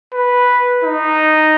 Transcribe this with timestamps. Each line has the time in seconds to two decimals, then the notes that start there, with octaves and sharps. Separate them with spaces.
0.14 B4
0.84 D#4